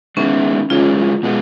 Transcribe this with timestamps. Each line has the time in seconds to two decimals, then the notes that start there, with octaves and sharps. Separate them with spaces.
0.17 D#3 G#3 B3 C#4 E4
0.70 C#3 E3 G#3 C#4 F4
1.23 B2 G#3 B3